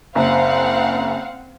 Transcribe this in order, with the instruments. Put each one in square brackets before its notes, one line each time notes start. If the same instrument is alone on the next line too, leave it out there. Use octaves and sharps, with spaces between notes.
[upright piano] F#1 [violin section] C4 F5 F#5